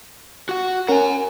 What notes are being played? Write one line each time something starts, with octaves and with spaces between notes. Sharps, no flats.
F#4 F#5
C#4 A#4 F#5 G#5